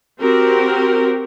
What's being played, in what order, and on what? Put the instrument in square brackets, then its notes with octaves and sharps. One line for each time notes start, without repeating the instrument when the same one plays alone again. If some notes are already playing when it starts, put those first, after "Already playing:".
[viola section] C4 F#4 G4 A#4